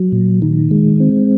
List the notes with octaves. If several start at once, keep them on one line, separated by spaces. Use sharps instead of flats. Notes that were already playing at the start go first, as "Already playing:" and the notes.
Already playing: F#3
A#2
D#3
G#3
C4